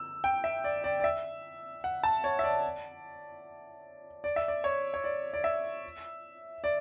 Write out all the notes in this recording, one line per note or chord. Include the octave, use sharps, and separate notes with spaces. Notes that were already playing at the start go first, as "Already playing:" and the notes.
Already playing: E6
G5
E5
D5
D5
D5
E5
F#5
A5
C#5
E5
D5
D5
E5
D5
C#5
C#5
D5
D5
E5
D5